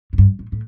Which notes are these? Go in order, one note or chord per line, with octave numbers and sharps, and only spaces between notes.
A2
G2
A2
A2